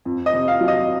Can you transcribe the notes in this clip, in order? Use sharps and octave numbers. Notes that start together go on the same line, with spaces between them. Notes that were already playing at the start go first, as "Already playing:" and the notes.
F2
D#5
C3
F5
F#3
D#5